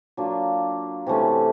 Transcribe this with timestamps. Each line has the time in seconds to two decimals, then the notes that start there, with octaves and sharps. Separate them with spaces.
0.17 F#3 A#3 D4 F4
1.07 C3 E3 A3 C#4